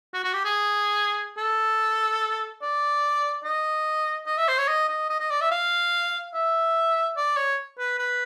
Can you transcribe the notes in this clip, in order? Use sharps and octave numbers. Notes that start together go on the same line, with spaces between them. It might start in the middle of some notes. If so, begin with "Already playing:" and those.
F#4
F#4
G4
G#4
A4
D5
D#5
D#5
E5
C5
C#5
D#5
D#5
D#5
D#5
D5
E5
F5
E5
D5
C#5
B4
B4